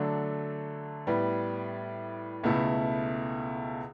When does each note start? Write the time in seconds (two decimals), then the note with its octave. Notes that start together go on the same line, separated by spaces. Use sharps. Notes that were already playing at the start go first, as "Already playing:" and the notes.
Already playing: D3 F#3 A3 D4 A4
1.07 A2 G3 B3
2.44 C#2 B2 A3 E4 A4